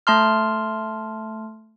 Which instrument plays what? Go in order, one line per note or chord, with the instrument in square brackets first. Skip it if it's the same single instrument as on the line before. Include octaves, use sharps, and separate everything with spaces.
[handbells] A3 A5 C6 F6